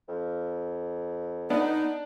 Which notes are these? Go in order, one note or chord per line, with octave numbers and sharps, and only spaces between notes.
F2
B3 D4 D#4